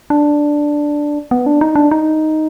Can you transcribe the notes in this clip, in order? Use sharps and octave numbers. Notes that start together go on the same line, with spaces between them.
D4
B3
D4
D#4
D4
D#4